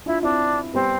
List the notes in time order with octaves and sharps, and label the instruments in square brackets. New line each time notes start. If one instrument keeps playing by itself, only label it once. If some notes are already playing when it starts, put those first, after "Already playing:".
[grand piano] D4 F4 [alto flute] E4
[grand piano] C4 E4 [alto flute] D4
[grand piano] G3 B3 [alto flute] C4